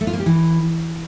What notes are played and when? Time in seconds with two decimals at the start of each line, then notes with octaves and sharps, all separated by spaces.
0.01 A3
0.07 F4
0.13 A#3
0.20 G4
0.26 E3